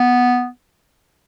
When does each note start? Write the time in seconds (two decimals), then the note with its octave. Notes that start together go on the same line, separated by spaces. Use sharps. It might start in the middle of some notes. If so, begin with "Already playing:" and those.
Already playing: B3